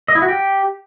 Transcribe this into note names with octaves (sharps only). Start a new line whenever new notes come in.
D#5
E4
F#4
G4